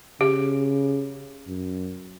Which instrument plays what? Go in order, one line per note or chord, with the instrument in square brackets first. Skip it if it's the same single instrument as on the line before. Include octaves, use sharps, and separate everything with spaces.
[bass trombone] C#3 [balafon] G4
[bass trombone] F#2